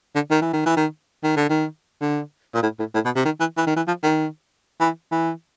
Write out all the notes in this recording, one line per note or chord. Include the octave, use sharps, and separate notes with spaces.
D3
D#3
E3
D#3
E3
D#3
D#3
D3
D#3
D3
A#2
A2
A2
A2
B2
C3
D#3
E3
E3
D#3
E3
F3
D#3
E3
E3